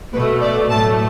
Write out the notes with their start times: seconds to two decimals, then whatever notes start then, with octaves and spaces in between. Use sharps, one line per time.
0.13 B2 A3 B4
0.42 D5
0.71 A2 F#3 A3 A5